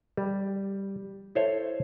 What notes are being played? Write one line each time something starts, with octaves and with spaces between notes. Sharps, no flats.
G3
E4 A4 C5 C#5